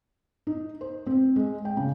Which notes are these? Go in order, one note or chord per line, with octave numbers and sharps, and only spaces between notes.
D#4
C5
C4
G#3
G5
C#3